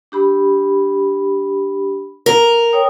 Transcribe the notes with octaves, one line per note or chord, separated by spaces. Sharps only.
D4 G4 B5
A#4
C#5 G5 D#6